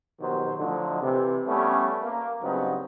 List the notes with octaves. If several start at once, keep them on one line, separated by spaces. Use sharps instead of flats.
A#1 B2 D#3 F#3 G4 C5
A2 D3 F3 F#3 D#4
C3 E3
G3 A3 B3 C#4
A#3
G2 C#3 F#3 B3 C4 D#4